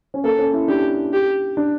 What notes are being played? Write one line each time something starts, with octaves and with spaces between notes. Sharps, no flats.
C#4
A#3 A4
C#4
E4
D4 G4
G4
D4